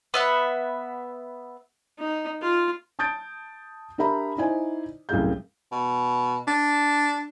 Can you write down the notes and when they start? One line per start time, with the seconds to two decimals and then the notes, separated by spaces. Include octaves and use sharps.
0.14 B3 E5 F#5
1.99 D#4
2.42 F4
2.99 A5 D#6 G6 A6 D7
3.98 D4 G4 A#4 E5 A#5 B5
4.38 D#4 E4 C5 D5 G#5
5.09 C2 F#2 A2 G#4 F5 G6
5.72 B2
6.48 D4